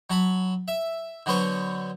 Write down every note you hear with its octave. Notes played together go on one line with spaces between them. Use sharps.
F#3 A5 B5
E5
D3 F#3 B3 C5 C#6